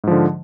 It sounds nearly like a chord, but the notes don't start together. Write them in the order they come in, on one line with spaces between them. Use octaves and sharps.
G#2 F3 D3